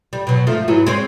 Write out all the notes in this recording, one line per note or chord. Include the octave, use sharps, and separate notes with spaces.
G3
B2 F#3
G#2 F3 A3
G#2 E3 F#3
G#3 C4 C#5